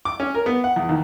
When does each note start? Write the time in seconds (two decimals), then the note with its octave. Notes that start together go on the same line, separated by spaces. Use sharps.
0.05 D6
0.20 C#4
0.34 A#4
0.46 B3
0.64 F#5
0.76 E2
0.89 D#2